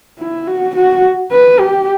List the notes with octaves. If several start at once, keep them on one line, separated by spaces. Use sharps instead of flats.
E4
F#4
F#4
B4
G4